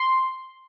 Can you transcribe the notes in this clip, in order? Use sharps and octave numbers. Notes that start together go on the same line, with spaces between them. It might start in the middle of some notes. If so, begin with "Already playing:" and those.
Already playing: C6